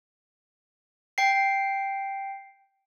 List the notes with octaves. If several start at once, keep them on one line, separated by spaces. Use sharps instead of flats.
G5 C7